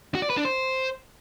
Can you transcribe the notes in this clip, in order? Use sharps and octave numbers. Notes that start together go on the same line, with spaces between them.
F#4
D5
B4
D4
C5